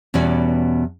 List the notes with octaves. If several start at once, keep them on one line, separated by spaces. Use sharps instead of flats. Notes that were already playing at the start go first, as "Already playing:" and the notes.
E2 B2 G3 C#4 D5